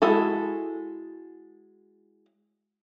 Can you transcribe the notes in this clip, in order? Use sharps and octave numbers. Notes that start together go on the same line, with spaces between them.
G#3 E4 F#4 A4